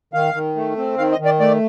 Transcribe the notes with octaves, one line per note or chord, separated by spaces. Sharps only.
D#3 F5
D#3
A3
C4
D#3 F5
D#5
D#3
D5
A3 D5